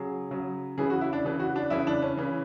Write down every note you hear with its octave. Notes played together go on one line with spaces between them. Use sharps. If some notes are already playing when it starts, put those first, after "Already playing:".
Already playing: C#3 F#3 G#4
C#3 F#3
C#3 E3 G#4
F#4
E4
D4
C#3 E3
F#4
D4
C#3 E3 E4
D4
C#4
C#3 E3